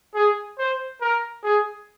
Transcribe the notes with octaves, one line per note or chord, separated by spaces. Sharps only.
G#4
C5
A#4
G#4